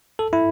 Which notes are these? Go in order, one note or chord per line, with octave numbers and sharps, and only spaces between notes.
A4
E4